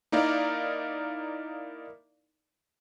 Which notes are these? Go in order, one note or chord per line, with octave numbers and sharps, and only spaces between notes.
A#3 D#4 E4 A#4 D5 F5